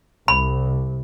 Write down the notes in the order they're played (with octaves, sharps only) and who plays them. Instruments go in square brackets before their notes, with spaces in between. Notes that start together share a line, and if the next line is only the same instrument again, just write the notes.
[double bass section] C2 [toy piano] B5